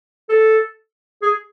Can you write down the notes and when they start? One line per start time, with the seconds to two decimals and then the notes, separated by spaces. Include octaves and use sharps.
0.30 A4
1.23 G#4